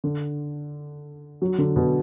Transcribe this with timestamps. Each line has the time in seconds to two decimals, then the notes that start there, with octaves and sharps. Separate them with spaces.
0.04 D3
1.42 F#3
1.58 D3
1.76 B2